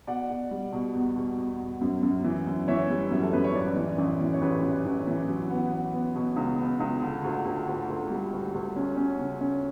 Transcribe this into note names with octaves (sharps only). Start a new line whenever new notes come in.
B2 D5 F#5
B2
G3
B2
E2
B2
E2
E2
F#2
F#2
E3
F#2
E3 C#5 E5
G3
F#2
A4
F#2 B4
C#5
A1 B4 D5
E3
A1
E3
C#5
A1 G4 B4
E3
A1
E3
F#3
B3
B3
B3
B2
C#2
B3
C#2
D3
D2
D2
D2
D2 A4
G3
D2
D2
C#4
C#4
C#3
C#4